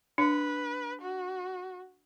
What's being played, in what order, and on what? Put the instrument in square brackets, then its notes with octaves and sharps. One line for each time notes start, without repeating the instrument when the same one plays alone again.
[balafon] D4 [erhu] B4
[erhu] F#4